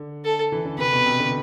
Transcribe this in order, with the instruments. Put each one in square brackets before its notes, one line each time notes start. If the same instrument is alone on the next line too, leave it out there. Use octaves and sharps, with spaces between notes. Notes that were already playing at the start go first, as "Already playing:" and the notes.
Already playing: [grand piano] D3
[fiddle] A4
[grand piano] E3
D3
[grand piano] C3 [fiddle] B4
[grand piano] B2
C3
D3